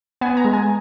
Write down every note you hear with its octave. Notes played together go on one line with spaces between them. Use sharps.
B3 G#5
A#5
G#3
G#5